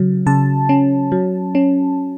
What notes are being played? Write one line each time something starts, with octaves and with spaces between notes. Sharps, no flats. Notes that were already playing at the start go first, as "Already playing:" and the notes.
Already playing: C#3 F#3
C#3 A5
C#4
F#3
C#4